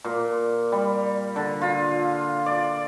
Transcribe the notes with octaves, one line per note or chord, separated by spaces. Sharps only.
A#2
G3
D3
F4
D5